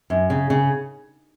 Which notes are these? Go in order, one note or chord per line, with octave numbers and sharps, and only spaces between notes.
F#2
C#3
C#3